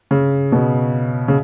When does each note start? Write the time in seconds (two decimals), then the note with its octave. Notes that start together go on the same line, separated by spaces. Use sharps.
0.11 C#3
0.52 B2
1.28 C#3